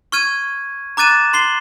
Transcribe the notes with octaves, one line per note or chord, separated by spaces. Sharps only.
C#6 F6 G#6 D#7
A#5 D6 F#6 A6 D#7 E7
C6 C7 G7